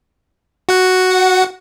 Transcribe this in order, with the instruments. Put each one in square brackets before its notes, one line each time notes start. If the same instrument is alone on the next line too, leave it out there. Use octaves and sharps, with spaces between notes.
[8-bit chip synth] F#4 F#5